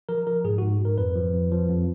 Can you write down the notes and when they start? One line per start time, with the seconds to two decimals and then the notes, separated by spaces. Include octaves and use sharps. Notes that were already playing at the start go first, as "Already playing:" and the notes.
0.09 F3 A#4
0.27 F3 A#4
0.44 G#2 G#4
0.58 G#2 F#4
0.80 G#2 A#4
0.98 F2 B4
1.16 F3
1.34 F2
1.51 F3
1.69 F2